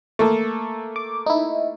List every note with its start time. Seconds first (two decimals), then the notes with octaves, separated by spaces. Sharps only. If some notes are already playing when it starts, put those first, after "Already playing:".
0.19 A3 A#3 A4
0.96 D6
1.26 D#4 E4